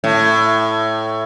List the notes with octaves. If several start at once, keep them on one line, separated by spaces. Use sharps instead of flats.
A2